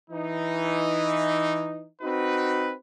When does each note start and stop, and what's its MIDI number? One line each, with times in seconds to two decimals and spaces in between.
0.11 1.86 52
0.11 1.86 63
2.02 2.73 60
2.02 2.73 63
2.02 2.73 66
2.02 2.73 71